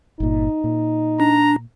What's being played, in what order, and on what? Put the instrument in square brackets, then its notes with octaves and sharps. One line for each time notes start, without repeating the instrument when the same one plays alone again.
[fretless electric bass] G1 A#2 [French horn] D#4
[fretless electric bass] A#2
[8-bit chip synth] D4 [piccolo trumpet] A#5